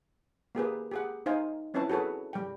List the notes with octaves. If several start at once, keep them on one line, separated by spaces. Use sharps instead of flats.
A#3 G4 G#4 B4
G4 G#4 F#5
D#4 C5 F5 G#5
C4 C#4 E4 B4 C#5 A5
F#4 G#4 A4 B4 C#5
G3 G5